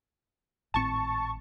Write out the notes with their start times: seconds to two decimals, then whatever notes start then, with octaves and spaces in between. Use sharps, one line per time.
0.74 G#1 A2 C4 A5 C#6